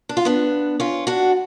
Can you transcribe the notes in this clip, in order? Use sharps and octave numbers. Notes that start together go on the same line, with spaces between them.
D4
F4
B3 D4
C#4 F4
D4 F#4